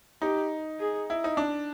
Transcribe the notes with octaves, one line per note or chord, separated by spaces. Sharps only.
D#4 G4
G#4
E4
D#4
D4